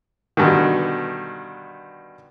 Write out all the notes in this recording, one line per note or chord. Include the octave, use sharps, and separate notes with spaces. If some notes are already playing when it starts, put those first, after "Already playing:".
G2 B2 D3 D#3